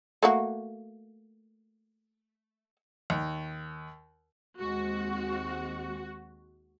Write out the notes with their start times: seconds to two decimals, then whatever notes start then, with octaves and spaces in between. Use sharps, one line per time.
0.23 A3 A#3 F#4
3.10 D#2
4.60 D#2 G#3 C4 F#4